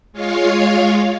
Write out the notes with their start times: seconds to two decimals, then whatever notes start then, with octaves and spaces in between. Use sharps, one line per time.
0.13 G#3 F4 C#5 F5